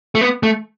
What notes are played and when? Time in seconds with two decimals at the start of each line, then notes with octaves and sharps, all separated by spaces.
0.15 A3
0.21 B3
0.43 A3